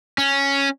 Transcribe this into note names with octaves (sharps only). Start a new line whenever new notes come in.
C#4